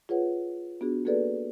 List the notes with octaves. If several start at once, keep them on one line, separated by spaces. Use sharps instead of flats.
F4 G#4 B4 C#5 F#5
B3 D4 F#4 G#4
A#3 F#4 G#4 A4 B4 D5